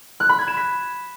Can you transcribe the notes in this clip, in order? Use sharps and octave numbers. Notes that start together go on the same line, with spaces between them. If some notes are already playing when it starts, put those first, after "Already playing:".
F#6
B5
G#6
E7
B6